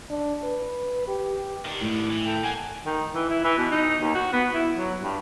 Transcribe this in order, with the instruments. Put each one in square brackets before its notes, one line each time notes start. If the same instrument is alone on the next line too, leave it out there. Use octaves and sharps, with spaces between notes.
[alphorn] D4
B4
G4
[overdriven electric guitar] D#3 D4
[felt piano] A2
[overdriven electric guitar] E3
[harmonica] A4 G5
[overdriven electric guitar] A#3 [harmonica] F#5 G#5
[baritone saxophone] D#3
E3
E4
E3
B2
D#4
D#2
F#4
B3
E4
F#3
G2